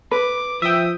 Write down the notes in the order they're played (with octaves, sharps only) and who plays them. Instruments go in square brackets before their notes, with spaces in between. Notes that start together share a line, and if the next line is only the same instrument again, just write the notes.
[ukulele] B4 [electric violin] D6
[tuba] F3 [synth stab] E5 G5 [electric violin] D#6